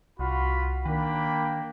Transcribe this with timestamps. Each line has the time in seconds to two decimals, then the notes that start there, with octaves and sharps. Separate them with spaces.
0.19 C2 F4 F#4 B5
0.86 D#3 A#3 D4 G5 B5